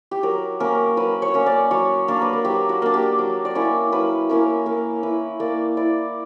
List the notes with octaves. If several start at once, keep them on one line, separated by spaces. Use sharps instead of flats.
G4
F#3 A#4
A#3 C#4 A#4
F#3 B4
C#5
A#3 C#4
D5
F#3 C#5
A#3 D4 A#4
B4
A#4
F#3 G4
F#4
A#3 D4
G4
F#3
D5
A#3 C#4 E4 C#5
F#3 B4
A#3 C#4 E4 A#4
A#3 A#4
E4 B4
A#3 D5
E4 D5